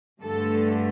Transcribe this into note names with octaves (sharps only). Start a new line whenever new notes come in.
G2 D3 A3 A4